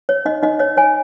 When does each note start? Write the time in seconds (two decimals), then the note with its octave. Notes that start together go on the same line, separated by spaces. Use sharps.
0.09 C#5
0.25 D#4 D#5
0.43 D#4 D#5
0.59 C#5 D#5
0.77 C#5 G#5